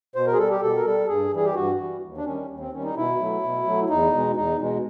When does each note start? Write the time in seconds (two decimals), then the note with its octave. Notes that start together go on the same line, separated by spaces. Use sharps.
0.15 B2 C5
0.27 A#4
0.33 G#4
0.38 G3 A4
0.50 G4
0.61 B2 A4
0.76 A#4
0.86 G3 A4
1.08 G2 G#4
1.32 E3 G3 G#4
1.45 G4
1.55 G2 F#4
1.79 E3 G3
2.02 D#2
2.17 D4
2.25 D#3 G3 C#4
2.50 D#2
2.60 C4
2.72 D#3 G3 C#4
2.84 D#4
2.96 B2 E4
3.19 F#3 A3
3.43 B2
3.66 F#3 A3
3.90 E2 D#4
4.13 B2 G#3
4.36 E2 D#4
4.60 B2 G#3